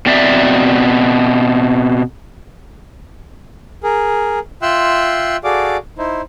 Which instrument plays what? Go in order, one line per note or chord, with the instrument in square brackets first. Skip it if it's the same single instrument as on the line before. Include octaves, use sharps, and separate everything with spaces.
[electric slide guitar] B2 C4 D5 E5
[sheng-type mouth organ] G#4 A#4
F4 E5 G5 C6 E6 F#6
F#4 G#4 A4 D5 F5 D6
D#4 E4 C5